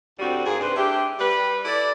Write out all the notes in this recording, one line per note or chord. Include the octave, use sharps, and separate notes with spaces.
D2 A2 G3 C4 F#4
G#2 A#3 G#4
G2 C3 D4 B4 C5
A3 D4 E4 G4
G3 B4
E4 A4 D5